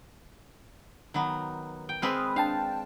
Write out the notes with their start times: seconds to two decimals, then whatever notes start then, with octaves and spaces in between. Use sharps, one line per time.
1.14 D#3 F#3 B3
1.89 G5
2.02 G#3 C4 B4 B5 D#6 F6
2.36 D4 F5 G5 A5